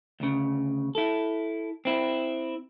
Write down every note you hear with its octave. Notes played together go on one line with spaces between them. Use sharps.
D2 C#3
E4 A4
C4 E4